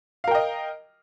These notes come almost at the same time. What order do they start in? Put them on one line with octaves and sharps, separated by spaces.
F5 A#4 G5 D#5